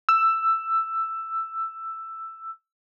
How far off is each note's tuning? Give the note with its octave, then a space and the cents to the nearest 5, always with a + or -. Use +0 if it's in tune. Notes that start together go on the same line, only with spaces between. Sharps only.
E6 +10